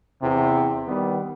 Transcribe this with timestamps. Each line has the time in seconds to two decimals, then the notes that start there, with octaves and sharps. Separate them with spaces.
0.22 E2 C3
0.87 D#3 G3 B3